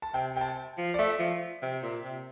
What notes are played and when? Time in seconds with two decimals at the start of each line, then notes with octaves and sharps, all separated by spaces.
0.02 A5
0.14 C3 G5
0.35 C3 G5
0.41 A5
0.78 F3
0.94 D5
0.99 A3 E5
1.19 F3
1.62 C3
1.82 A#2
2.04 C3